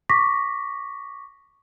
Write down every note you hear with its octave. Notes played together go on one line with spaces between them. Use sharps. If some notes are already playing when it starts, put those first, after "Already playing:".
C#6 D6 A#6 B6